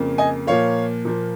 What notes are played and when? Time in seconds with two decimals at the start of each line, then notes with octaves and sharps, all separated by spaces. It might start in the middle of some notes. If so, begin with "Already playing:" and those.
Already playing: F2 C#3 A#3
0.18 D#5 G#5
0.47 A#2 F3 A#3 C#5 F5
1.05 A#2 F3 A#3